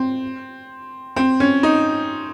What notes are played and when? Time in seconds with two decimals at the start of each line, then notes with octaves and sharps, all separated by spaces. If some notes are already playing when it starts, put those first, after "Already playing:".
Already playing: C4
1.16 C4
1.40 C#4
1.63 D#4